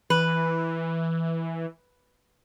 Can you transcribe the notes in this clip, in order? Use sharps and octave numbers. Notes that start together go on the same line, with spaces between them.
E3 B4